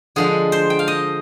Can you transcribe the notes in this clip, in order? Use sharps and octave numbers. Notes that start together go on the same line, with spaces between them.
D3 F3 G#3 G#4
C5
G5
F5
D#5